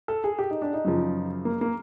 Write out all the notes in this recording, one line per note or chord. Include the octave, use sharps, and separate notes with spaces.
A4
G#4
G4
D#4
D4
D#4
F#2 C#3 F3
A#3
A#3